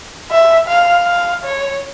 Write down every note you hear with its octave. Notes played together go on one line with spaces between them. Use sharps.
E5
F5
F5
C#5